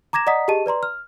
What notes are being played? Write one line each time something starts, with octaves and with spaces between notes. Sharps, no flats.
A#5 D6 G#6 A#6 E7
D5 D#5 F#5 A#5 D#6 B6
G4 G#4 D#5 A5 D#7
B4 D5 A#5 C6
F6